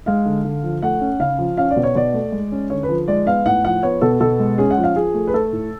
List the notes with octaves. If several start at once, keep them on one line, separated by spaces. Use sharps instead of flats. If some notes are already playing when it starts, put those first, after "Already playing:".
G#3 F5
D3
D3
F3
A3 F#5
C#4
C#3 F5
F3
C#4 F5
D5
B2
C#5
B2 D5
A3
G#3
C#4
D3 C#5
B4
F3
G#3 D5
B3 F5
A2 F#5
F3 F#5
B3 C#5
B2 A4
B2 A4
G#3
C#4 G#4
F#5
F3
F5
F3 G#4
A3
B4
A3 A4
A2